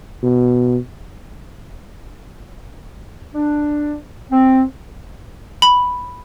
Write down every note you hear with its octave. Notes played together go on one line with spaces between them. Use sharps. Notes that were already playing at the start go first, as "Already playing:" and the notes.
B2
D4
C4
B5